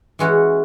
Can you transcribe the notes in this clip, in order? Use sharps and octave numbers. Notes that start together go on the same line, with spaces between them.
E3 G#3 C#4 F#4 C#5